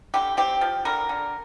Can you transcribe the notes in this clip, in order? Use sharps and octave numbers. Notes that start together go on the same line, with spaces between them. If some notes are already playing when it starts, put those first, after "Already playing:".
D3 G4
C4 G4
F3
D3 A#4
D3